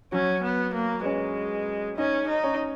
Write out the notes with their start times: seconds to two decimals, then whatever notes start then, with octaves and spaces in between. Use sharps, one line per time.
0.12 F#3 C#4 F#4
0.43 B3
0.74 A#3
1.01 B4
1.05 G#3 C#4 C#5
1.97 C#4 D#4 D#5
2.28 D#4
2.44 C#4 C#5